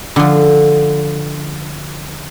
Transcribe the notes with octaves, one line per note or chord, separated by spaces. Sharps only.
D3 F3